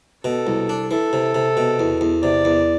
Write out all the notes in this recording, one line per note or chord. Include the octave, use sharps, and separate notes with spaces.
B2 A4
C2
D4
E3 A4
C3
C3
B2
E2
E2
C3 D5
E2